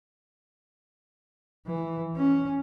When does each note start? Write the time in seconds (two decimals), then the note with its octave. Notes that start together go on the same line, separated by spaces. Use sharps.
1.66 E3
2.16 C#4